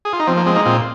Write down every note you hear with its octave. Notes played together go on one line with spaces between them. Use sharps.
G#4
F4
D#4
F3 C4
A#3
G#3 C4
A#3 D#4
A#2 C4 F4